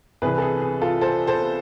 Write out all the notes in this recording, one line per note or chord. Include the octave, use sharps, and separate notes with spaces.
C2 C3 E3 G#4 B4
A4
G#4
G#4
F4 A4
A4 C5
A4 C5